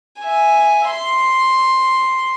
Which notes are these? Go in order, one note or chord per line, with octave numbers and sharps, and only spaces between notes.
E5 G#5
C6